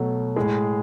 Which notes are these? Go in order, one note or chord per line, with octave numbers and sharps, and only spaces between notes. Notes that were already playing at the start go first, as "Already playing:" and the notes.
Already playing: B2 F#3 A3
A2 G#3 G#4